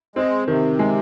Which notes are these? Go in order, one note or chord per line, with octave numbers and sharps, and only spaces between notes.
G#3 C4
C3 D#3
G#3